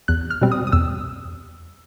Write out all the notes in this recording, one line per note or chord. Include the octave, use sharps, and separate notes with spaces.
E2 F#6
F6
B2 G3 C4
D#6
D#6
E2 E6